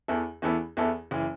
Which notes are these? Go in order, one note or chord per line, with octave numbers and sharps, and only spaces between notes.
E2 E3 B3 E4 A4
E2 E3 B3 E4 A4
E2 E3 B3 E4 A4
F#1 E3